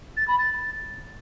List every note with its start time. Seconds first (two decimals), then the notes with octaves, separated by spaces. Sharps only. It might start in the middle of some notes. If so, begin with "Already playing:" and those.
0.17 A6
0.28 B5
0.39 A6